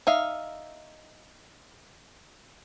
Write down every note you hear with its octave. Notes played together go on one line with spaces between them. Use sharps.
D#4 E5 F5